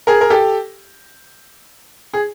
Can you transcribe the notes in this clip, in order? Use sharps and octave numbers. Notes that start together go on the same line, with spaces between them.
G#4 A#4
A#4
G4 A4
G#4